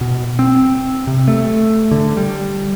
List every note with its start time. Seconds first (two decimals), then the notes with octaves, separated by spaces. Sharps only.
0.01 B2
0.39 C4
1.07 C3
1.28 A3
1.91 D3
2.17 G3